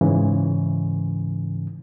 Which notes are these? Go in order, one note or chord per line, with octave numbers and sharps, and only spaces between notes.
G#2 C#3 E3